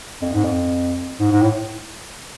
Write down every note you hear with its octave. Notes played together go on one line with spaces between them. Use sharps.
F2
G#2
F2
G#2
G#2
A2